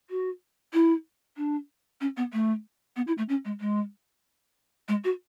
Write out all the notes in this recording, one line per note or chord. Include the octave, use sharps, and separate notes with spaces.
F#4
E4
D4
C#4
B3
A3
B3
E4
A3
C#4
G#3
G#3
G#3
F#4